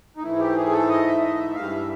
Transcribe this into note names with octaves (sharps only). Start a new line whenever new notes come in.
D#4
G#2 E3 A3 E4
G4
G#4
A4
D#5
E5
D#5
E5
G2 E3 G3 F5
E5